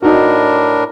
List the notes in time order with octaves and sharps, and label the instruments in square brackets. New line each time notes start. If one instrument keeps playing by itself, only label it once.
[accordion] A2 D4 A#4 [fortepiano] D#4 F#4